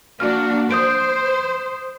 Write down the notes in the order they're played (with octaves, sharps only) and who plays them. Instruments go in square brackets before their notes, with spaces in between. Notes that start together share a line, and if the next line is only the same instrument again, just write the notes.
[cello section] A#3 D4 F#4 [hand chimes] F6
[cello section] C5 [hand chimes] D#6 G6 D7